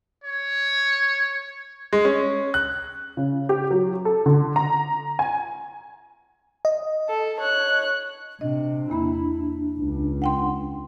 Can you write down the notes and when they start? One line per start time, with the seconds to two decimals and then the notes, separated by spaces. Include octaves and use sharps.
0.24 C#5
1.93 G#3
2.05 C#4
2.54 F#6
3.17 C#3
3.49 G4
3.71 F#3
4.05 A4
4.26 D3
4.56 A#5
5.19 G#5
6.65 D#5
7.09 A4
7.40 C#5 F#6
8.41 C3 D4 D#5
8.90 E2 A#3 E4 B5
9.78 C#2
10.22 F#5 G5 C6